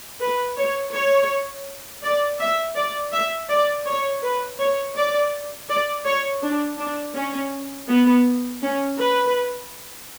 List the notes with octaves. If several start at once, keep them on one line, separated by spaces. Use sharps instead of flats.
B4
C#5
C#5
D5
E5
D5
E5
D5
C#5
B4
C#5
D5
D5
C#5
D4
D4
C#4
B3
C#4
B4